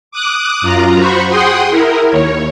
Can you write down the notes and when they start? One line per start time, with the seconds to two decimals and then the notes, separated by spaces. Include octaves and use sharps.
0.12 D6 D#6 F#6
0.62 F#2 F4 A#5
0.97 F#4 C5 B5 C#6
1.29 G#4 F#5 G5 C6 D#6
1.70 E4 A#4
2.09 D#2 C#5